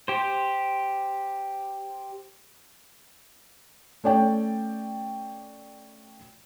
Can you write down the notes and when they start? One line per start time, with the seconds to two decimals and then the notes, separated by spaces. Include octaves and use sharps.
0.08 G4 C5
4.04 A3 C#4 C#5 D5 G5